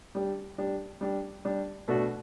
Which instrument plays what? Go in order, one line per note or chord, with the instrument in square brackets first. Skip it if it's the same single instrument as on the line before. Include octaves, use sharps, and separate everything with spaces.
[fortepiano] G3 D4 G4
G3 D4 G4
G3 D4 G4
G3 D4 G4
B2 A3 D4 F#4